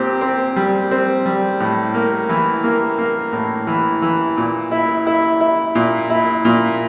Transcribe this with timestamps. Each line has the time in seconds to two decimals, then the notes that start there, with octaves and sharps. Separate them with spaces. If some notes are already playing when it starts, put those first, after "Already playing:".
Already playing: A#2 C4 G4
0.21 C4
0.56 G3
0.91 C4
1.26 G3
1.60 A2
1.94 A#3
2.29 E3
2.64 A#3
2.98 A#3
3.33 A2
3.67 E3
4.02 E3
4.38 A#2
4.71 E4
5.07 E4
5.41 E4
5.75 A#2
6.10 E4
6.45 A#2